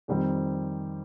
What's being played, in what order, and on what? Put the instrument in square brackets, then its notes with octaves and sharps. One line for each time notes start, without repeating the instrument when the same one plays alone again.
[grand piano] F2 D#3 G3 C4